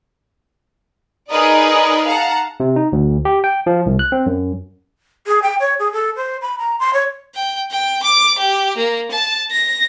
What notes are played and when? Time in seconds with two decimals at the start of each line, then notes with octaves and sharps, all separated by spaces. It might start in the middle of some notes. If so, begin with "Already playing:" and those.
1.30 D#4 G#4 A#4 B4 D5 D#5
2.07 F5 F#5 A5 A#5
2.60 C3
2.76 D#4
2.92 D2
3.25 G4
3.44 G5
3.67 F3
3.86 C2
3.99 F#6
4.12 C4
4.26 F#2
5.27 G#4
5.42 G5
5.60 C#5
5.79 G#4
5.93 A4
6.16 C5
6.42 B5
6.59 A#5
6.79 C6
6.93 C#5
7.35 G5
7.71 G5
8.03 D6
8.39 G4
8.77 A#3
9.11 A5
9.51 A#6